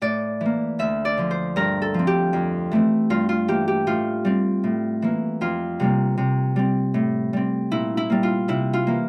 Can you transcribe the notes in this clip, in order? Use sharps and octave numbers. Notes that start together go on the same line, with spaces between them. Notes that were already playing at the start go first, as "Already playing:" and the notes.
A2 D5
E3 A#3
D2 E5
D5
D3 F3
C5
G2 A#4
A4
F3 C4
G4
F2
E3 A3 C4
G2 F4
F4
E3 A#3 G4
G4
A2 F4
G3 C4
A2
E3 A#3
F2 F4
C3 G3 A#3
C3
G3 C4
A2
G3 C4
A#2 E4
E4
G3 A#3
F4
C3 E4
F4
E3 A#3